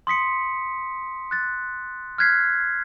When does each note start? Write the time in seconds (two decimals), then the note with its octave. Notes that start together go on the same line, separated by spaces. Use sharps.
0.07 C6 D#6 B6 C#7
1.31 F#6 A6
2.18 F6 F#6 G#6 B6 C7